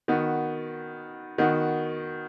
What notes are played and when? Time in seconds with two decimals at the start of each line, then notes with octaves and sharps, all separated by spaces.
0.08 D#3 B3 F#4
1.38 D#3 B3 F#4